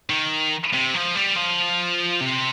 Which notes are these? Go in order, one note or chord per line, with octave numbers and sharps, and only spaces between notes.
D#3
C3
F3
G3
F3
C3